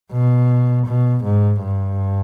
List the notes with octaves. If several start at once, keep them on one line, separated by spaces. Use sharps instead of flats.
B2
B2
G#2
G2